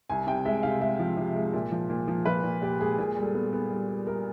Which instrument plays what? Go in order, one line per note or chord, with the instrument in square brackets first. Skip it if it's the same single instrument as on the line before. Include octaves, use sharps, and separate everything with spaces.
[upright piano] C2 G#5
C3 G5
G#3 E5
C3 F5
G#3 E5
F3
C3
G#3
A#2
F3
A#2
F3
F3 B4
A#2
A#2 G4
G#3 G#4
A#2 G#4
G3
A4
B3
B3
G3
G3
G3 A#4